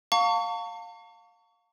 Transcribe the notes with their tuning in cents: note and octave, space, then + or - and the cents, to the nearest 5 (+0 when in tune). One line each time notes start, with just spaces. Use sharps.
F5 +20 A5 +45 C#6 +25